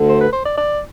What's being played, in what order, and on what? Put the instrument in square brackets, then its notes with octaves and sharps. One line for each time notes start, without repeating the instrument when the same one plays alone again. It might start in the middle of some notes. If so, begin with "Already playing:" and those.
Already playing: [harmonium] D2 D3
[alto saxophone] C5
B4
C5
D5
D5